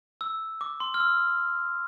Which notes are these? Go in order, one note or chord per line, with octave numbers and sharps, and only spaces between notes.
E6
D6
C6
F6
E6